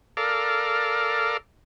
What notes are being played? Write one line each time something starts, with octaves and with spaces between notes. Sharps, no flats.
A4 A#4 D5 F5